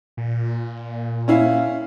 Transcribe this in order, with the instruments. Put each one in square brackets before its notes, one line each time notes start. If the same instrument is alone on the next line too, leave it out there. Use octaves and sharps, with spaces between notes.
[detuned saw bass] A#2
[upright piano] C#4 E4 F5